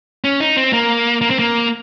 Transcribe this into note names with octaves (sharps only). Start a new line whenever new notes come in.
C#4
D#4
C4
A#3
A#3
C4
A#3